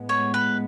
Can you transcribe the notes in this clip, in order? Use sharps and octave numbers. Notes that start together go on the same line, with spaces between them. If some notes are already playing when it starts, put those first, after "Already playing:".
Already playing: A2 G#3 B3
C#5
B4